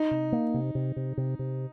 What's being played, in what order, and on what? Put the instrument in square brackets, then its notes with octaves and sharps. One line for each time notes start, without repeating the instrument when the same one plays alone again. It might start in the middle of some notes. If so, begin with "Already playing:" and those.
Already playing: [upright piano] D#4
[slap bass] C3
A#3
C3
C3
C3
C3
C3